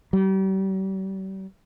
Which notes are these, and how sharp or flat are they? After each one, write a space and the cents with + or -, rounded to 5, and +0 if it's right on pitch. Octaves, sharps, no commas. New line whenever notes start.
G3 -40